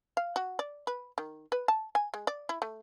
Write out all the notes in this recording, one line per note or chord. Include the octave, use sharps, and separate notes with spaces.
F5
F#4
D5
B4
D#3
B4
A5
G#5
G#3
D5
E4
A3